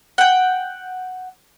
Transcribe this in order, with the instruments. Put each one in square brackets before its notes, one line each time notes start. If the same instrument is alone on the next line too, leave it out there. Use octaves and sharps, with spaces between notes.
[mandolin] F#5 G5